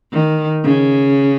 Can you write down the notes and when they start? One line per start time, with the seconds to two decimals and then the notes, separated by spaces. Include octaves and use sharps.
0.12 D#3
0.63 C#3